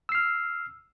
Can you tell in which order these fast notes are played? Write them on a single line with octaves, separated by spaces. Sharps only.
E6 C7 F6